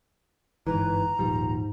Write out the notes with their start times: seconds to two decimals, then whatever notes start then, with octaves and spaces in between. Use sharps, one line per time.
0.67 G1 G#2 E3 B4 A#5
1.19 D#1 G#2 F3 G3